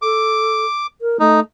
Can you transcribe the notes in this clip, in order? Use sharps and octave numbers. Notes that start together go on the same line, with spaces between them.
A4 D6
A#4
A3 D#4